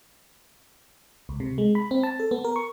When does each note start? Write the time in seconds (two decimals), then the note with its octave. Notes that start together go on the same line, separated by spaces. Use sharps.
1.29 C#2
1.40 C3
1.58 G#3
1.75 B5
1.91 C4
2.03 A5
2.20 A4
2.31 B3
2.44 A#4
2.56 C#6